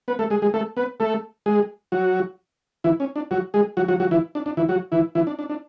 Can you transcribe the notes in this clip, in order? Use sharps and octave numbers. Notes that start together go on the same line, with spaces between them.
B3 B4
A3 A4
G#3 G#4
G#3 G#4
A3 A4
B3 B4
A3 A4
G#3 G#4
F#3 F#4
E3 E4
C#4
D4
F#3 F#4
G#3 G#4
F#3 F#4
F#3 F#4
F#3 F#4
E3 E4
D4
D4
E3 E4
F#3 F#4
E3 E4
E3 E4
D4
D4
D4